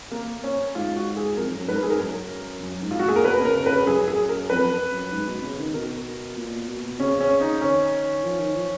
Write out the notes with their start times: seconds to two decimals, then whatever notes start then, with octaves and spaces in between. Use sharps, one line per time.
0.12 A#3
0.44 C#4
0.74 G#2 F4
0.96 F#4
1.17 G#4
1.37 F2 A#4
1.53 F#2
1.68 G#2 B4
1.75 A#4
1.83 G#2 G#4
1.90 A#4
2.00 F#2
2.62 F#2
2.83 G#2
2.91 F4
2.99 F#4
3.04 A#2 G#4
3.16 A#4
3.24 B2 B4
3.41 C#3 A#4
3.56 C#3
3.66 B4
3.71 C#3
3.86 F#2 G#4
4.08 G#4
4.29 A#4
4.50 F2 B4
4.91 F#2
5.12 G#2
5.28 B2
5.43 C#3
5.58 D#3
5.74 B2 A#4
6.37 A#2
6.68 B2
7.00 C#3 C#4
7.21 C#4
7.41 D#4
7.61 D#3 C#4
8.24 F3
8.40 D#3
8.56 F3